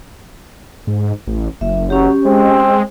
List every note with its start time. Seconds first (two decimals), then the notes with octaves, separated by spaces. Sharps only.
0.87 G#2
1.27 A1
1.61 F#1 E5
1.90 F#3 C#4 G4
2.25 G#3 C4